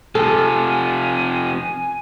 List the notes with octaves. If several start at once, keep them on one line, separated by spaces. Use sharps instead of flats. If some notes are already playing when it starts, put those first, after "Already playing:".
C3 F3 A4 G#5